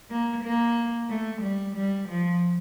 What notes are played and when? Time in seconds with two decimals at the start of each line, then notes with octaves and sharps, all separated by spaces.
0.11 A#3
0.43 A#3
1.10 A3
1.42 G3
1.76 G3
2.09 F3